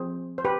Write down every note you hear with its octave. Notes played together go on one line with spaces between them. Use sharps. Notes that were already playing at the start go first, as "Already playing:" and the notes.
Already playing: F3 C4 G#4 C5
C5
G4 B4